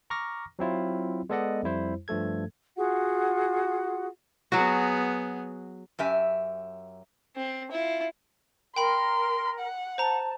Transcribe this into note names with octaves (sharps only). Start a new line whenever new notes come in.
A#5 C#6 D6 F6 A#6
F#3 C4 E4 F4
G#3 B3 A4 D5 D#5 F#5
F2 G3 E4 C5
G2 F3 A3 A4 G#6
F4 F#4 G#4 F#5
F#3 B3 F#4 G#4
F#2 G4 E5 G#5
C4
E4 F4
A#4 G5 B5 C6
F#5
C5 A5 A#5